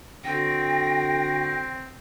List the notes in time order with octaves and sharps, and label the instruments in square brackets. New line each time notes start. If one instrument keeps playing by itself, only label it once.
[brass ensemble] D3 F#4 [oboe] C4 [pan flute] G5 [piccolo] A#6